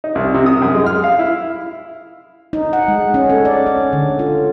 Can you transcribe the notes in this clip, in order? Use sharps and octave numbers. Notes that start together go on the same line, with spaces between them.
D#4
C2
C3
D#6
F#2
G#3
F6
F5
E4
D#4
F#5
G#3
C#4
A4
D5
C#4
D3
F4